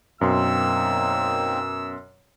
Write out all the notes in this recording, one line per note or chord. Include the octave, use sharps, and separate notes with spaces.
F#2 B2 A#3 C4 D#4 C6 E6